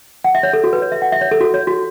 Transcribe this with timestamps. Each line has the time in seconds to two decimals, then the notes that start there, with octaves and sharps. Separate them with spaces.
0.24 F#5
0.35 E5
0.43 C#5
0.53 A4
0.64 F#4
0.73 B4
0.82 C#5
0.92 E5
1.02 F#5
1.12 E5
1.21 C#5
1.31 A4
1.41 F#4
1.54 C#5
1.67 F#4